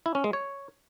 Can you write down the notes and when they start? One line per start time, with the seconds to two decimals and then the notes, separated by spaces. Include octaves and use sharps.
0.06 E4
0.15 C#4
0.24 G#3
0.33 C#5